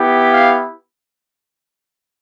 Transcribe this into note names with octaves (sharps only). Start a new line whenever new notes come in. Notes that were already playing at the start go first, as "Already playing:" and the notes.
Already playing: B3 E4 G4
F5